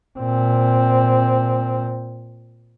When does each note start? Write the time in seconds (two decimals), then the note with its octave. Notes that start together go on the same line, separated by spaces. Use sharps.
0.19 A#2 C4